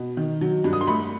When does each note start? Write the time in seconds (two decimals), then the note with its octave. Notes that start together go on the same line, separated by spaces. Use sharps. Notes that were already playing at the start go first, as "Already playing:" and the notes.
Already playing: B2
0.17 D#3
0.41 F#3
0.64 G2
0.73 D#6
0.81 C6
0.87 A3 B5